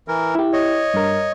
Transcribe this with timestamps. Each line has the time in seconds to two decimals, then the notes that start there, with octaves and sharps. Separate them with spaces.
0.08 E3 A#4
0.35 E4 G4
0.53 C#5 D#5
0.94 G2 A#4